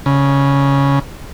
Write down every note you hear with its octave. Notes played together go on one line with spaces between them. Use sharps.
C#3